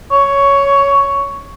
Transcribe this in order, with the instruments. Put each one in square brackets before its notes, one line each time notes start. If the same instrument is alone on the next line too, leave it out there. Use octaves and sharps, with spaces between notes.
[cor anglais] C#5